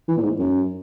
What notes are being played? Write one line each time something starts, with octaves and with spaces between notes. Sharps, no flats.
E3
A#2
G#2
F#2